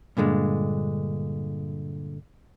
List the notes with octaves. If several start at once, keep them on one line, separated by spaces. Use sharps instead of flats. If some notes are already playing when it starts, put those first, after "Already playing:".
G2 A#2 D3 G#3